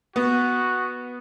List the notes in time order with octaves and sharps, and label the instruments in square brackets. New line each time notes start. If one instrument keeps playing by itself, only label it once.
[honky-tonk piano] B3 [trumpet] F#4